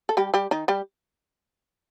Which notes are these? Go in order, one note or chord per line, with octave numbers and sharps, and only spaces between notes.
A4
G3 G4
G3 G4
D#3 D#4
G3 G4